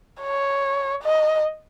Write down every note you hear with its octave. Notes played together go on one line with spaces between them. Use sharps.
C#5
D#5